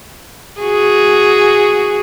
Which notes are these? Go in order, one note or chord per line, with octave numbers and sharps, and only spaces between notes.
F#4 G#4